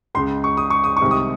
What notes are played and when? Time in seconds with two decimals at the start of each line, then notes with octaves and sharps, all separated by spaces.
0.15 C#2 C#3 G#3 C6
0.44 C#6
0.57 D#6
0.70 C#6
0.84 D#6
0.97 C#6
1.02 C2 C3 D#3 G#3
1.11 D#6